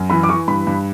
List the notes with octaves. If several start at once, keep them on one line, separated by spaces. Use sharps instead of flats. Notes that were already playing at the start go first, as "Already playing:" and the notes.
Already playing: F#2
E3 B5
D6
E3 C#6
G2 B5
G2